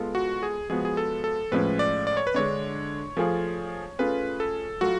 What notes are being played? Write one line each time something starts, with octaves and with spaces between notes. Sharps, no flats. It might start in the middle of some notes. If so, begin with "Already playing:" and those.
Already playing: G#3 B3 F4 A4
F#4
G#4
F3 G#3 B3 F#4 G#4
G#4
A4
A4
A2 F3 G#3 C#4 B4
D5
D5
C#5
B4
D3 G#3 D4 C#5
F3 A3 F4 G#4
A3 C#4 F4 G#4 B4
A4
F#3 A3 F4 F#4